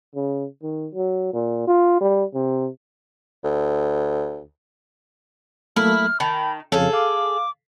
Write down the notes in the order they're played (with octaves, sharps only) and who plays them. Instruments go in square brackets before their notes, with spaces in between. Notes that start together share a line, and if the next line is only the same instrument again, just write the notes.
[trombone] C#3
D#3
F#3
A#2
F4
G3
C3
[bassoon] D2
[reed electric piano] F#3 A3 A#3 [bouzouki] E4 [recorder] F6
[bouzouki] D#3 [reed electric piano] A5 [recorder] B5
[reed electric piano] F2 C#3 F5 [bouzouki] G#4 A4 [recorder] C#5
[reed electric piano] F5 [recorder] D6